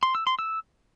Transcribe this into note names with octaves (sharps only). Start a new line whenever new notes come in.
C6
E6
C6
E6